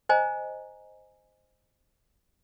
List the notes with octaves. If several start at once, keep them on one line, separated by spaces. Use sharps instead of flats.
C5 D#5 G#5 A#5